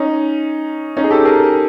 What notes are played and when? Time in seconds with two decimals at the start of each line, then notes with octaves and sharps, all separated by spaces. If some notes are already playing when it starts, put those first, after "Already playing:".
Already playing: C#4 D#4
0.97 C#4 D#4
1.04 G#4
1.11 G4 A4
1.25 G#4 A#4